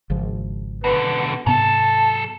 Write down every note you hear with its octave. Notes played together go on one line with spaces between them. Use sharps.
G#1 C#3 F3
B2 D3 B4
G#2 C3 F#3 B3 A4 A5